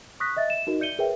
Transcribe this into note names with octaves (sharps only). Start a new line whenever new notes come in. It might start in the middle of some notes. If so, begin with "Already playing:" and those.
C#6 D#6 F#6 A#6 B6
D#5 E5 A6
E7
D#4 F#4 A#4 D#5
D5 E5 G6 C#7 D#7 G7
G#4 A#4 B4 C#5 E5 G5